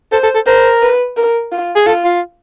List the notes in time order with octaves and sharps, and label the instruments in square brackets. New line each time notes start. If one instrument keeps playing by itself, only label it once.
[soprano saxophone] A4 [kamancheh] C5
[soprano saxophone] A4
A4
[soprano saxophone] A#4 [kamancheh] C5
[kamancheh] B4
A#4
F4
[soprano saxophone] G#4
[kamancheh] F4 [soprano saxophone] A4
[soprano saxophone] F4